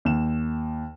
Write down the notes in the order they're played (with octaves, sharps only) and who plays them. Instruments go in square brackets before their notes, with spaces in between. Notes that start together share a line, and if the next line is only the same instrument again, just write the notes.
[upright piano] D#2 E7